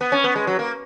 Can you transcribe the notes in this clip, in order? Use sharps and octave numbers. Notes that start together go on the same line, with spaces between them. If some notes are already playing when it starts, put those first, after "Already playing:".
B3
C#4
B3
G#3
F#3
A#3